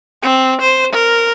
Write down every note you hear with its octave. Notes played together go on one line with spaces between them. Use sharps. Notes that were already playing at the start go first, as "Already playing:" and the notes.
C4
C5
A#4